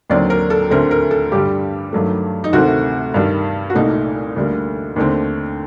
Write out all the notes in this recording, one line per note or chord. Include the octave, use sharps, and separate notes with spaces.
D#2 D3 F#3 C4 D5
A#4
A4
D2 D3 A3 C4 A#4
A#4
A4
G2 D3 G3 G4
G2 D#3 F#3 A3
D#4
D2 C3 D#3 A3 C4 F#4
G2 D#3 G3
F#4
C2 A#2 A3 D#4
D2 D3 G3 A#3
D#2 D3 A3 C4